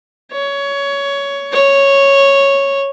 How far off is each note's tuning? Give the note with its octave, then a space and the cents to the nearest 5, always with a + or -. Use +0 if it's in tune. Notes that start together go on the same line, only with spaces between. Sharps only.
C#5 +15
C#5 -5